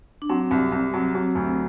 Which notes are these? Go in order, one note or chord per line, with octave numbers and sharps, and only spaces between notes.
D4
F#3 C4
C2
C2
F#3
F#3
D2